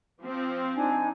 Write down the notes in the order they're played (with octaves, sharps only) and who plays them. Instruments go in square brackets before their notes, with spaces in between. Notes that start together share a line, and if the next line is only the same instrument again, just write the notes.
[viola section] F3 C4
[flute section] D4 D#4 G#5